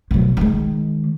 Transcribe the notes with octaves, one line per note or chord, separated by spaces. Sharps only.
B2 F#3
D#3 G#3